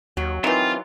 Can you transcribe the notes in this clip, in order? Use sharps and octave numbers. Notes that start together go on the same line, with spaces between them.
D#2 F#3
D#3 E3 C4 F4